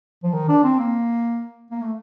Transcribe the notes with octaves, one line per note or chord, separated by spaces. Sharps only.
F3
D#3
D4
C4
A#3
A#3
A3